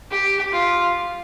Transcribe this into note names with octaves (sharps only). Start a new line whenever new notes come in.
G4
F4